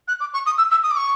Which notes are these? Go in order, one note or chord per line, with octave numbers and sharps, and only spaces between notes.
F#6
D6
C#6
D#6
E6
E6
D#6
D6
C#6